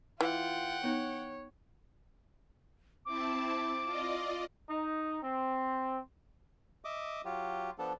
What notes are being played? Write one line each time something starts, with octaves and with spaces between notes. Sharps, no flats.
E3 F4 F#5 G5
B3 D#4 C#5
C4 E4 A5 D6
F4 D5 D#5
D#4
C4
D#5 E5 D6 D#6
F#3 F4 G4
F3 B3 D4 A4